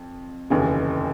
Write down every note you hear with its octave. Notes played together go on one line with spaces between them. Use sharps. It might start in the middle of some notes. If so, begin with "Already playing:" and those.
Already playing: F2
F1 D#2 C#3 E3